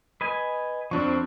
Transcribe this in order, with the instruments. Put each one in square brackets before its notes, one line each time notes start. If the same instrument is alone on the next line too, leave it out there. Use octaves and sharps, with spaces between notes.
[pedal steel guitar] B4 D#5 G#5
[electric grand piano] F2 D4 C#6 [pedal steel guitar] F3 C4